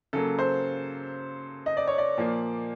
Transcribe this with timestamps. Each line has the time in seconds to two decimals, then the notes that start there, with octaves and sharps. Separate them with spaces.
0.13 C#3 F#3 A#3 A4
0.39 C5
1.66 D#5
1.77 D5
1.87 C#5
1.98 D5
2.17 A#2 F3 A#3